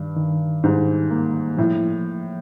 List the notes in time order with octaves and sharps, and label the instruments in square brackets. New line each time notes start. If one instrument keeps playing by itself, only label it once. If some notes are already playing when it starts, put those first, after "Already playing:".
Already playing: [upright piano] G2 [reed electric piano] D#3
[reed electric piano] D#3
[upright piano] G#2 [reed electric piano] G3
[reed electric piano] A#3
[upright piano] A2 [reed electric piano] F3